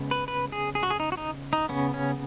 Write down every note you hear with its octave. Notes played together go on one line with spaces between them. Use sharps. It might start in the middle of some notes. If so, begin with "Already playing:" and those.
Already playing: C#3 G#3 B3
B4
B4
G#4
G#4
F#4
G#4
D#4
F#4
D#4
D#4
C#3 B3 C#4
C#4